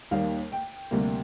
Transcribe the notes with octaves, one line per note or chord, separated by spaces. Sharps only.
D#2 D#3 G3 A#3 F5
G5
D2 C3 G3 A#3